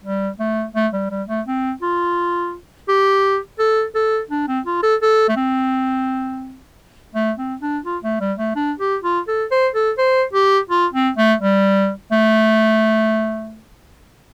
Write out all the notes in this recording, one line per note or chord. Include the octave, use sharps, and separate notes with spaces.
G3
A3
A3
G3
G3
A3
C4
F4
G4
A4
A4
D4
C4
F4
A4
A4
A3
C4
A3
C4
D4
F4
A3
G3
A3
D4
G4
F4
A4
C5
A4
C5
G4
F4
C4
A3
G3
A3